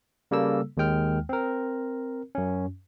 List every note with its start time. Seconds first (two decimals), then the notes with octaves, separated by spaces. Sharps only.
0.31 C#3 G3 A#3 A4 E6
0.77 D#2 D#3 G#3 G5 F6
1.29 C4 A#4
2.35 F#2 C#4